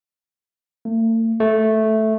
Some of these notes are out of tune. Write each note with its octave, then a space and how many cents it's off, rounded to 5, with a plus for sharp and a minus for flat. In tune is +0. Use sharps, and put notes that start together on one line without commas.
A3 +45
A3 -5